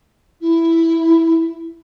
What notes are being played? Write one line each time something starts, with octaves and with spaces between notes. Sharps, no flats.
E4